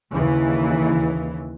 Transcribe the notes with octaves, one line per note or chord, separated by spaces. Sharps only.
D#2 C#3 E3